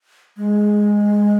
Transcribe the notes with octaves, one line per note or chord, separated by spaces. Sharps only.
G#3